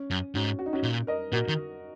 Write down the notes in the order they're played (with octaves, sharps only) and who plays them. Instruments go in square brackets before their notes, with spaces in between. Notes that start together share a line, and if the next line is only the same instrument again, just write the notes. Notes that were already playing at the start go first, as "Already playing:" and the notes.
Already playing: [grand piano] C#4
[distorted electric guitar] F#2
[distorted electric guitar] G#2 [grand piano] C#4 F#4
[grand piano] F#4
D#4
C#4 F#4
[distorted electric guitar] A#2
[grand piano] A#4 D#5
[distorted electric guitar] A#2 [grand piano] F#4 A#4
[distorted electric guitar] D#3